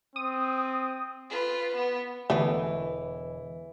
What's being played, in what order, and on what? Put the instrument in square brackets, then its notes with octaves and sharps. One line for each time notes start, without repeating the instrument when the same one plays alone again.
[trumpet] C4 [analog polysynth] D#6
[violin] F4 B4
B3
[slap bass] E1 [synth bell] D3 [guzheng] E3 [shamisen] A3 B3